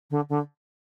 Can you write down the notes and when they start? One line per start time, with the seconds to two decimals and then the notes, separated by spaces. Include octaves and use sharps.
0.11 D3
0.29 D3